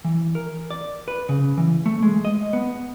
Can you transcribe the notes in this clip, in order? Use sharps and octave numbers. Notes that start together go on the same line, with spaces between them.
E3
A#4
D5
B4
C#3
E3
A3
G#3
D#5
B3